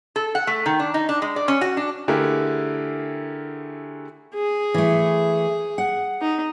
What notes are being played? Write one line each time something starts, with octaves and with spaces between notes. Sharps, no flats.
A4
F#5
A3
D#3
D4
D#4
D4
G#3
D5
C#4
F#4
D4
D3 A3 E4 G4 G#4 A#4
G#4
E3 A3
F#5
D#4